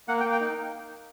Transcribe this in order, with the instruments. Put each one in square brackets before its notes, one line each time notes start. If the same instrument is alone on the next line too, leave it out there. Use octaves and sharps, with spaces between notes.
[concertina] A#3 F#5
G5
A#3
G5
D#4